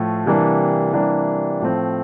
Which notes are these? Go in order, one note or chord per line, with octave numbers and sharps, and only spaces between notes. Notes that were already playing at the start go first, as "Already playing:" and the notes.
Already playing: A2 F3 A3
C3 E3 G3 A#3 D4
C3 E3 G3 A#3 D4
A2 F3 A3 C4